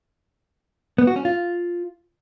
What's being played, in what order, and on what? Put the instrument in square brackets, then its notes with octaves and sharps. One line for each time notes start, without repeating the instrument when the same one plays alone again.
[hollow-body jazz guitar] B3
F#4
C#4
F4